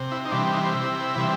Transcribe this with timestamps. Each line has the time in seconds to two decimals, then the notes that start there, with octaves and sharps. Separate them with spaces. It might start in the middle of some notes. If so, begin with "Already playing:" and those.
Already playing: C3
0.12 E4
0.25 D#4
0.32 E3 G3 C4 D4
0.53 D#4
0.74 C3 E4
1.15 E3 G3 C4